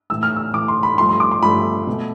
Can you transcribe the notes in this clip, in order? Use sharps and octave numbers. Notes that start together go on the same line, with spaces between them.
A2 E3 A3 E6
F6
E6
A2 E3 A3 D6
C6
B5
G2 F3 A3 C6
C6
D6
C6
G2 F3 A3 B5
B2 A3